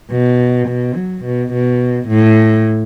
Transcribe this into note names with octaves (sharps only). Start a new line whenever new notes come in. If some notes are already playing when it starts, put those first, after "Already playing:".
B2
B2
F#3
B2
B2
A2